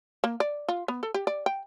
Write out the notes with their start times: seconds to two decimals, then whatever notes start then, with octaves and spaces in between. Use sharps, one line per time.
0.24 A#3
0.40 D5
0.68 F4
0.88 B3
1.03 A4
1.14 G4
1.27 D5
1.46 G5